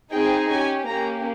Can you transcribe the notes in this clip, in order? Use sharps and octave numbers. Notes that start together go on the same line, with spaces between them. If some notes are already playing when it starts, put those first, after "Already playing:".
C4 D#4 G#4 G5
C#4 G4 G#5
A#3 C#4 G4 A#5